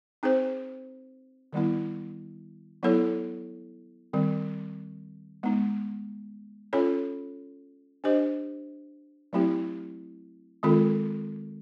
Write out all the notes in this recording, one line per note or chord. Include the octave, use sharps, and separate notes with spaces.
C4 D#4 G#4 C5
D#3 G3 B3 E4
F#3 B3 E4 A4 C#5
D#3 G3 C4
G#3 B3 D#4
C#4 F4 A4 C#5
D4 G4 C5 D#5
F#3 A3 C4 E4 G4
D#3 G#3 C4 F4 A4